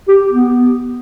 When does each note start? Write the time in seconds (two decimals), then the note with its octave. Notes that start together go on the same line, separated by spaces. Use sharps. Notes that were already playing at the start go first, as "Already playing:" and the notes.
0.08 G4
0.30 B3